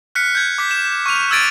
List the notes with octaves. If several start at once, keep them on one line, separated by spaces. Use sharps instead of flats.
F6 F#6 B6 C#7
G6 G#6
D6 B6
E7
C#6 F6 D#7 F7
E6 F6 G#6 A6 D7 D#7